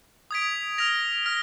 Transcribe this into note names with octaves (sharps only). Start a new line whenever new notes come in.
D#6 G#6 B6 D7
F6 A#6 F7
F6 A#6